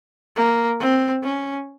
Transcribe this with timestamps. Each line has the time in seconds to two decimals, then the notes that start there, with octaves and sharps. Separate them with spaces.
0.36 A#3
0.80 C4
1.23 C#4